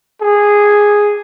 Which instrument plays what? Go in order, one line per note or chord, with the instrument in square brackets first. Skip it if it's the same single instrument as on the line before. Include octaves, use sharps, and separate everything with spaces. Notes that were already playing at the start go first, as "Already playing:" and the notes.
[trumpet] G#4